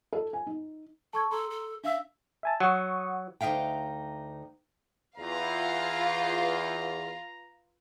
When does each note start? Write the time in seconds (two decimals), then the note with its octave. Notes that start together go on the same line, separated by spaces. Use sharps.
0.13 A4
0.33 G#5
0.47 D#4
1.13 A4 A5 C#6 G#6
1.31 A4 A#5 C6
1.50 A4
1.84 D4 E5 F5 E6
2.43 E5 G#5 A5
2.60 F#3 F#5 C#6 D#6
3.41 D2 D#4 E5 F5 G5
5.17 E2 F4 B4 F5 A#5